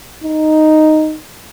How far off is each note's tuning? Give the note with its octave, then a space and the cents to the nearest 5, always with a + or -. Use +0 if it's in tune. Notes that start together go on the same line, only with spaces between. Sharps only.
D#4 -5